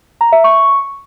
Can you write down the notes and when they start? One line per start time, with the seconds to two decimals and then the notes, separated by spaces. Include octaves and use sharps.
0.21 A#5
0.32 E5
0.44 C#6